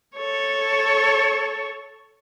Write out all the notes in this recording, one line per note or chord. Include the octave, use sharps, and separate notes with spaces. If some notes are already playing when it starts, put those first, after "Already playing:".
A4 C#5